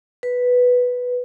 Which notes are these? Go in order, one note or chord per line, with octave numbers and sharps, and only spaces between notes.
B4